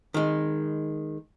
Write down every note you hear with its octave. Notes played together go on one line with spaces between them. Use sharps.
D#3 G#3